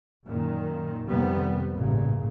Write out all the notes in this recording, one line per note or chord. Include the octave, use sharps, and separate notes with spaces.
F#2 A#2 D#3
F2 G#2 C3 D#3 G3 B3
A1 G2 A#2 C#3